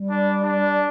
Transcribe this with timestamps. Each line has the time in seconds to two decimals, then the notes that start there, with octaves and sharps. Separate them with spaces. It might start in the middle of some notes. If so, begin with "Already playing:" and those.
Already playing: G3
0.10 D4
0.43 D4